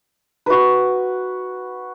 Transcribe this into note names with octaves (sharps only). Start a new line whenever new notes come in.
F#4 B4